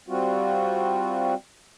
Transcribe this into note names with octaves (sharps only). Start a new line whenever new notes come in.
G3 C4 F4 F#4